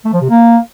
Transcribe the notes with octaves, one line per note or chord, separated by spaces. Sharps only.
A3
F3
C3
A#3